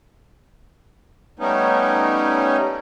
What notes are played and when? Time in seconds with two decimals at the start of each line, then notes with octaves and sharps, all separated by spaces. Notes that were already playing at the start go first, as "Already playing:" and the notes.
1.39 G3 A3 B3 C#4 D#4